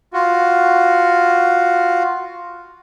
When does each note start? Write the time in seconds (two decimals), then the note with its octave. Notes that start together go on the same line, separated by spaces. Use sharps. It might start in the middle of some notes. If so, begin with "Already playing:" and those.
0.13 F4 F#4